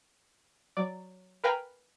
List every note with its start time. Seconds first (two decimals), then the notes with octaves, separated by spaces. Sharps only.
0.77 F#3 D5
1.44 A#4 B4 F5 G5 G#5 A#5